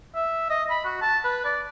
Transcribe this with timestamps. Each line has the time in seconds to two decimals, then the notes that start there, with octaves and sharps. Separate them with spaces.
0.15 E5
0.50 D#5
0.70 B5
0.85 F#4
1.02 A5
1.25 B4
1.45 D5